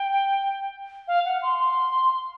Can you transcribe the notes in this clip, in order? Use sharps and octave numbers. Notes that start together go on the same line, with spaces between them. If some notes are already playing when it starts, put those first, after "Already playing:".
Already playing: G5
F5
F#5
C6
C6